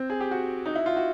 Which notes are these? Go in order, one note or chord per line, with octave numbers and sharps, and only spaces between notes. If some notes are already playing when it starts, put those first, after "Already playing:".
Already playing: C4
G#4
G4
F#4
D#4
E4
F4
F#4